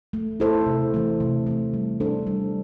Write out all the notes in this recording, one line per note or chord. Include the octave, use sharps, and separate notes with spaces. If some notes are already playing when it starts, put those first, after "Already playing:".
A3
E4 A4 C5
C3
E3 A3
C3
E3 A3
G3
D4 A4 C5
G3